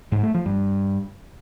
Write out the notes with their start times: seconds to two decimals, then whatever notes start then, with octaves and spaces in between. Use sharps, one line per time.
0.12 G#2
0.23 A3
0.34 F3
0.46 G2